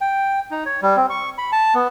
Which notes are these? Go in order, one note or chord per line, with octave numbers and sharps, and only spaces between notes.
G5
D#4
C#5
G3
C4
C#6
B5
A5
B3